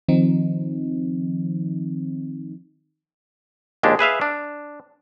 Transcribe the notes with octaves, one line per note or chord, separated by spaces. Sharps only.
D#3 F3 C4 D#4
A#1 D#2 G#3 D4 G4 A5
G#4 B4 E5 F5
D4